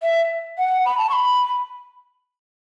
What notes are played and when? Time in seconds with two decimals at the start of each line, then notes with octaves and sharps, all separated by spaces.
0.02 E5
0.58 F#5
0.85 B5
0.97 A5
1.09 C#6
1.13 B5